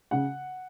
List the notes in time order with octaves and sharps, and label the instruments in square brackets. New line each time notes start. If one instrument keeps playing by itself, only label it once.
[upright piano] C#3 F#5